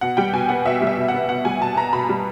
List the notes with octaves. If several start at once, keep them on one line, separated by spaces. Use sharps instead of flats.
B2 F#5
G3 G5
B2 G#5
B3 F#5
B2 E5
G3
E5
B2
F#5
B3
B2 F#5
G3 G#5
B2 A5
B3 A#5
B2 B5
G3